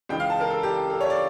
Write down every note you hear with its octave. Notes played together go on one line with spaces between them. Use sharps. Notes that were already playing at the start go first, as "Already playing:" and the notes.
C#2 C#3 E3 G5
F5
A5
A#4
A4
G4
A4
C#5
D5